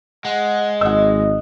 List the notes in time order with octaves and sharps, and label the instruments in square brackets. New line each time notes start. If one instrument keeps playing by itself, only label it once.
[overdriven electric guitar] G#3 [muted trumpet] F#5
[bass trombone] G#1 [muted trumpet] D#5 [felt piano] F#5 E6